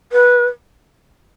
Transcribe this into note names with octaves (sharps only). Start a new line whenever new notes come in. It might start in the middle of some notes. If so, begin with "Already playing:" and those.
B4